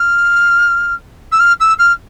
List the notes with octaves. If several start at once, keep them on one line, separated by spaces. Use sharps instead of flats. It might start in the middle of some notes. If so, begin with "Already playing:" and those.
Already playing: F6
E6
F6
E6
F6